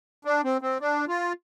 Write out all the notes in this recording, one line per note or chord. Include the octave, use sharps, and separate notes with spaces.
D4
C4
C4
D4
F4